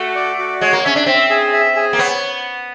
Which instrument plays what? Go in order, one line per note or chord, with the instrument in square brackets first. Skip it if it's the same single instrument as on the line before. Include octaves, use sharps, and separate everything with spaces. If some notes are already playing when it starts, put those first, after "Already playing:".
Already playing: [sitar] A3 [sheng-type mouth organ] F#4
[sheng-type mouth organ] D5
F#4
[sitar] G#3 [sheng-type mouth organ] C#5
[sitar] A#3
[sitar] C#4 [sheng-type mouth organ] E5
[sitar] D4
[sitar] C4 [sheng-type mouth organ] E5
[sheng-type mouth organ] G#4
E5
G#4
[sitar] A#3
[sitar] B3 [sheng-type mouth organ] C#5